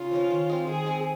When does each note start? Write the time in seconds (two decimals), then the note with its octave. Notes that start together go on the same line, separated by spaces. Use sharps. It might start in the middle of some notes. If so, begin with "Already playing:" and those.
Already playing: C#3 D#4 F4
0.11 F3 G#3 C#4
0.31 D#3
0.49 G#3 C4
0.67 D#3 G#4
0.86 G#3 C4